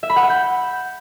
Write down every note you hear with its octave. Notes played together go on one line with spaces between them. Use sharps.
E5
B5
F#5
F#6
G6